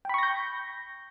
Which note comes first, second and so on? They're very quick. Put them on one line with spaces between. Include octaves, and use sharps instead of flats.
G5 B5 C#6 A#6 G6